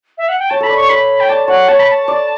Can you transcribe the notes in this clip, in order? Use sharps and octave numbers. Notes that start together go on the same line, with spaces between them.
E5
F#5
G5
C#5 A5
A4 B5
D5
C#5 C#6
B4 B5
G5
D5 A5
C#5 F#5
C#5 A5
B5
A5
D5